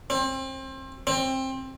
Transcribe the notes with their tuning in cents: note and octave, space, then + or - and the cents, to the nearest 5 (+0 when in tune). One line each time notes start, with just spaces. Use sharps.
C4 +30
C4 +20